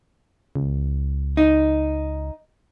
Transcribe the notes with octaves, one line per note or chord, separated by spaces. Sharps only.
C#2
D#4